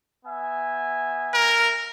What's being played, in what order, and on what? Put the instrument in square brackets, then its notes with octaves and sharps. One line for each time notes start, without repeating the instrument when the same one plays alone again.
[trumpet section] B3 E5 G#5
[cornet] A#4